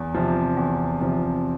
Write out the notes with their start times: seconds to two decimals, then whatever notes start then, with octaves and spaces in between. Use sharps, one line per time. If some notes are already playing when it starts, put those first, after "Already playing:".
Already playing: E2
0.14 C3 F3
0.57 E2
1.00 C3 F3